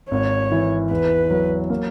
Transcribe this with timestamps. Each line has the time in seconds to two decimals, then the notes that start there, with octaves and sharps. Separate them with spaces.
0.11 G#1 C#5
0.52 E3
0.91 E2 B4
1.30 F#3
1.70 A#3